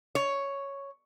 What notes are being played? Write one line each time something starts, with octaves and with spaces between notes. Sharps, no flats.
C#5